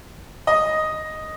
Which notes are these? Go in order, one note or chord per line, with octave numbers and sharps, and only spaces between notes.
D#5